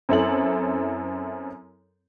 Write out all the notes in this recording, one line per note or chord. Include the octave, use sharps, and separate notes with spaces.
F#2 C4 E4 A4 C#5 F#7